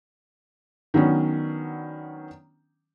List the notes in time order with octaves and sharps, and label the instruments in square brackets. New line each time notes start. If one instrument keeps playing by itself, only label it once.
[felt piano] D#3 F#3 B3 C#4 D4